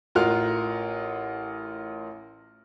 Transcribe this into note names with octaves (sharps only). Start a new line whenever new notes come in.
A1 F4 A#4 F#5 F6